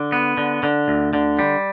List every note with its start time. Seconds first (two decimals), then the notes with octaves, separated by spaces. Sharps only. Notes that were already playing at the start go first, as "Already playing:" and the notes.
Already playing: D3
0.12 B3
0.37 D3
0.63 D3
0.88 D2
1.13 D3
1.39 G3